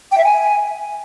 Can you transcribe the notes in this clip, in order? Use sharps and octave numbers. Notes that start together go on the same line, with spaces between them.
G5
E5
G#5